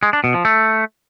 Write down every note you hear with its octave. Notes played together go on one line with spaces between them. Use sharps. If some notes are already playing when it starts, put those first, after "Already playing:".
G#3
D4
B2
F3
A3